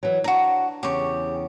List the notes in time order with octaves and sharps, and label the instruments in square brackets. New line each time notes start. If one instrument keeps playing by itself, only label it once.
[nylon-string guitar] E3 F#3
[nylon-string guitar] D4 [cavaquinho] F#4 A#5
[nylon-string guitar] E2 C#3 [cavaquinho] G4 C#6